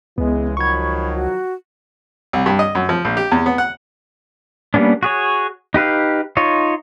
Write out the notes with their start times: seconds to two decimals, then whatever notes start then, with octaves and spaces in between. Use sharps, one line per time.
0.18 C#2 C#3 E3 G#3 B3
0.57 D#3 F3 F#3 B5 C#6 G#6
1.14 F#4
2.33 C2
2.46 G2
2.59 D#5
2.75 F#2
2.89 F3
3.05 A#1
3.17 G4
3.32 E2
3.46 B3
3.58 F#5
4.74 G3 A#3 B3 C#4 D4
5.03 F#4 G#4 C#5
5.74 D#4 G4 B4 F5
6.37 D#4 F4 C#5